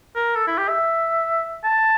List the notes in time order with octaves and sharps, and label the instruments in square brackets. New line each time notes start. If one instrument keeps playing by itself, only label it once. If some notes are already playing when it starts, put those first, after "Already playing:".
[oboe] A#4
A4
E4
G4
E5
A5